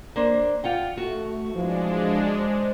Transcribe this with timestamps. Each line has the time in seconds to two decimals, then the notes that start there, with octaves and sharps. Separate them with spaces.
0.16 A#3 D4 C5
0.64 F4 F#5 G5
0.97 A3 F#4
1.53 E3 F3 G#3 D4
2.39 C5